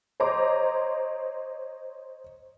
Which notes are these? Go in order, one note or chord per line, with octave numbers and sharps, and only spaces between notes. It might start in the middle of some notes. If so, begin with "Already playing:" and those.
C5 C#5 D#5 A#5 C6 D6